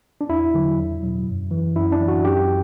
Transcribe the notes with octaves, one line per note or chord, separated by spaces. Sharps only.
D4
E2 E4
D3 F#3
E2
B2 F#3
F#2
E3
F#2 E4
D4
E3
F#4
F#2 G4